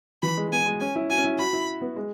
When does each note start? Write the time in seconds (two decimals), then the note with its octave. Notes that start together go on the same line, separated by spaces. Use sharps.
0.22 E3 B5
0.37 G#3
0.48 G#3
0.52 B3 G#5
0.66 G#3
0.80 C#4 G#5
0.95 E4
1.10 F#4 G#5
1.18 C#4
1.24 E4
1.38 F#4 B5
1.53 E4
1.81 B3
1.96 G#3